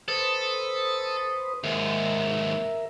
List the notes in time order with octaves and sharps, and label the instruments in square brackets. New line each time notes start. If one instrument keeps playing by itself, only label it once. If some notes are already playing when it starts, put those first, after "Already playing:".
[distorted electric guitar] A4 [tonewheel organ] B4 C5 D#6
[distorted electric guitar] D#2 G#2 [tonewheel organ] A#4 E5